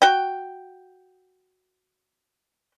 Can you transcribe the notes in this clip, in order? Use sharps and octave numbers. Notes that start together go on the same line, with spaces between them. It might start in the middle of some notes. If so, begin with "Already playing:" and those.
F#4 G5